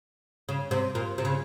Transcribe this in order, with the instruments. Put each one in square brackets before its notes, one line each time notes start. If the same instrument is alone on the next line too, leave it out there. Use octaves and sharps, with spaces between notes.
[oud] C#3
C3
A#2
C3
C#3